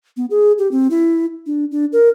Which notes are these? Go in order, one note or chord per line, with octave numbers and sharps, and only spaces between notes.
B3
G#4
G4
C4
E4
D4
D4
A#4